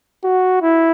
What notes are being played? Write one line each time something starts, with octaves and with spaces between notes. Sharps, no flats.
F#4
E4